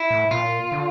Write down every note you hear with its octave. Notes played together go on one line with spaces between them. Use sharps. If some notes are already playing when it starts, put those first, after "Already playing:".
Already playing: E4
A2
A#2 F4
D3